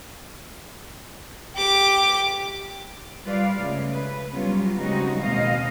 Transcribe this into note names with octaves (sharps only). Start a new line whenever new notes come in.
G4 D6
G3 F4 B4 D5 F5
C#3 G#3 A3
B4
F#3 G3 B3 C#4 F4
C#3 G3 G#3 C4 D#4 F#4
D#2 B2 G#3 C4 D#5 F5